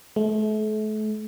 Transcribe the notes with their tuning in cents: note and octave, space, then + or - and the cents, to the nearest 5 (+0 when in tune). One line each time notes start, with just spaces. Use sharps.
A3 -35